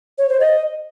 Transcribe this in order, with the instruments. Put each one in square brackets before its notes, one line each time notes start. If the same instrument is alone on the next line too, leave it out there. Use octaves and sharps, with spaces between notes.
[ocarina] C#5
C5
D#5